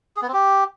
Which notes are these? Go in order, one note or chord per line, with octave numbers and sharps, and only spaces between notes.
G#4
B3
C4
G4